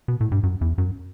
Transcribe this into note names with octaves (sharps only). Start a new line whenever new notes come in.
B2
A2
G2
F#2
E2
F#2